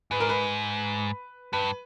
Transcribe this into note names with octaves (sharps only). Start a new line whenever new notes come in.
G#2 B4
A#4
B4
G2 B4